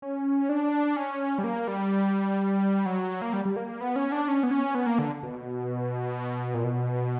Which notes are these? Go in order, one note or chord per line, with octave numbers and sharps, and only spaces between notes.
C#4
D4
C#4
G3
A#3
G3
F#3
A#3
G3
G3
A#3
B3
C#4
D4
C#4
B3
C#4
B3
A#3
D3
B2
A#2
B2